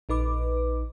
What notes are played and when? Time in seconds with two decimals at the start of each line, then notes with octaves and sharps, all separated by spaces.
0.09 A#1 D#4 B4 D6